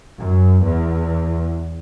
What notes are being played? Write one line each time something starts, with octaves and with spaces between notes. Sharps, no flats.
F#2
E2